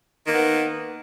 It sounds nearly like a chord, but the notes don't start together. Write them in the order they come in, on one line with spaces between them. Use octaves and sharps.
D#3 A#3 B3